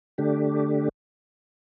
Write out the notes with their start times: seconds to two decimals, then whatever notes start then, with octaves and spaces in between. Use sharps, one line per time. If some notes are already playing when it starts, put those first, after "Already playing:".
0.18 D3 A3 D4 G4